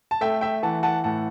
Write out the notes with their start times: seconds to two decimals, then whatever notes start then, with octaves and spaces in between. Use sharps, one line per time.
0.11 A5
0.21 A3 E5 G5
0.41 E5 G5
0.63 E3 F#5 A5
0.83 F#5 A5
1.04 A2 F#5 A5